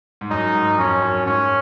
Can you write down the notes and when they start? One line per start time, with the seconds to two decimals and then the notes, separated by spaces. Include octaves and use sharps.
0.21 G#2
0.30 F#2 D#4
0.55 G#2
0.78 F2 C#4
1.02 F#2
1.26 G#2 C#4